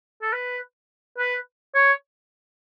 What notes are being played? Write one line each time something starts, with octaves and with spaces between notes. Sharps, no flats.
A4
B4
B4
C#5